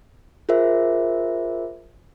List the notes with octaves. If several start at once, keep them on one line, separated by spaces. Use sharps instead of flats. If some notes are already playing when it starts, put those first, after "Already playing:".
F4 G#4 A#4 C5 E5